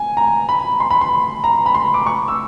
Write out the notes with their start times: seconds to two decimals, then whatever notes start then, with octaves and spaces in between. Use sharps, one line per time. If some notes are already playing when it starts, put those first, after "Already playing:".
Already playing: G#5
0.17 A#5
0.49 B5
0.80 C6
0.91 B5
1.01 C6
1.44 A#5
1.66 B5
1.75 C6
1.94 D6
2.06 C#6
2.28 E6